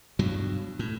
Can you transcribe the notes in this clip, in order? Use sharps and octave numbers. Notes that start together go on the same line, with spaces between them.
G2 B2 F#3
A2